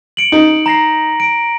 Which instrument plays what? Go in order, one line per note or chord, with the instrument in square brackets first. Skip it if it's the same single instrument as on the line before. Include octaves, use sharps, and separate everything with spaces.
[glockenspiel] C#7 D7 F#7
[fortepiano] D#4
[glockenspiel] A#5 A#6 C7
D7